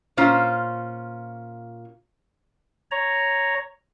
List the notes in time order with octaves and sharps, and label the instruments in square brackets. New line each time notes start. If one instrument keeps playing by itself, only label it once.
[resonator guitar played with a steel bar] A#2 C#4 F4 C5
[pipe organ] C#5 A#5